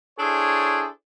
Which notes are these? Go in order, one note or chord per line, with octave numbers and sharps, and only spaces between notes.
D4 E4 G#4 A4 C5 C#5